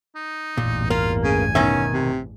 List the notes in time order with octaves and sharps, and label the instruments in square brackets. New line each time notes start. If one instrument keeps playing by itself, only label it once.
[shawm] D#4
[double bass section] A1 E2 G2 [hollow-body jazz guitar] A#2
[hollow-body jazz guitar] A#3 [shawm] F4
[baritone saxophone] C#3 [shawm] G#5
[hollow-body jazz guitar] B2 D#3 E5 [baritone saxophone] C#4
[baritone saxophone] C3